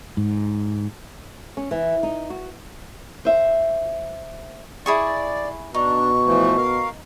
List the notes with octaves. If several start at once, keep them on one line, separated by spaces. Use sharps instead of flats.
G#2
C#4
E3
D#4
F#4
C5 E5
E4 G#4 D5 C#6
B2 D4 D#4 C#6
E3 F3 A3
A#4 F5